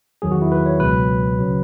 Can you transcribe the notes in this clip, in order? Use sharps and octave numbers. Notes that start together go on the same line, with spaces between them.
E2 D#3 F#3 G#4
F#4
E4
B4
C#5
C#2 B2 F#3 B4
C#3 F#3